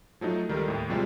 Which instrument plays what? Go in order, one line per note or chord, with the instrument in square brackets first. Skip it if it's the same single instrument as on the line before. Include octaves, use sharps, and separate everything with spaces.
[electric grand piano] F3 F#3 A3 D#4
C#2 D#3 G3 D#4 A4 A#4
D#2 A2
C3 F3 G3 G#3 C4